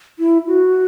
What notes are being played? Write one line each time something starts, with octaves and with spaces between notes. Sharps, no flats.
E4
F#4